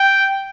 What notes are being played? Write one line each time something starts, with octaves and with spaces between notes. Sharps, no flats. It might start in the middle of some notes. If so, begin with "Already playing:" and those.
Already playing: G5